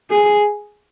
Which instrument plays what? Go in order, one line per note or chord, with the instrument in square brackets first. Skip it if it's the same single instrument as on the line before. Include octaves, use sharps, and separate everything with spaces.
[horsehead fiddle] G#4